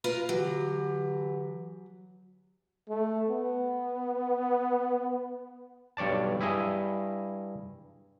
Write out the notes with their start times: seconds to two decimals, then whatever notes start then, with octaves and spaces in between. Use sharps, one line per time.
0.04 F4 A#4 B4
0.29 D3 E3 F#3 G4
2.89 A3
3.29 B3
5.97 B1 G2 C#5 D5 A5
6.40 G2 E4 G#4 D#5